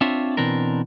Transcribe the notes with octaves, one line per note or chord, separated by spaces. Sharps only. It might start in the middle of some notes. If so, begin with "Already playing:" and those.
C4 D4 F4 C5 C#5 E5
B2 E3 C4 D4 A#4